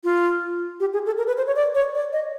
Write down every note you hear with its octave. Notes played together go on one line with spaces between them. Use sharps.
F4
G4
G#4
A4
A#4
B4
C5
C#5
D5
C#5
D5
D#5